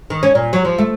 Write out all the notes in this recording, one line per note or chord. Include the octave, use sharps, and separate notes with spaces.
D#3
C#4
A#2
F#3
F3
A3